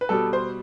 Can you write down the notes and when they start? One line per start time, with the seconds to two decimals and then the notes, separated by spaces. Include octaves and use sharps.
0.01 B4
0.09 B2 G3 A4
0.33 C5